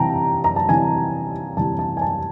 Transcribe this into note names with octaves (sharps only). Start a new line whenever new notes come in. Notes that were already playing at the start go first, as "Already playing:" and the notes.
Already playing: C3 E3 G3 G5 A5 A#5
A#5
A5
C3 E3 G3 G#5
C3 E3 G3 A5
A5
G#5
A5